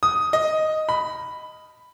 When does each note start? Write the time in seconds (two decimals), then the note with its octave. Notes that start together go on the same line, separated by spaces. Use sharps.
0.03 D#6
0.33 D#5
0.89 B5